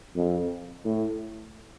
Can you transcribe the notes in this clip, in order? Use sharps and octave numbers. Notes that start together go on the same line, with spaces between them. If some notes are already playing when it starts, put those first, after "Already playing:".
F2
A2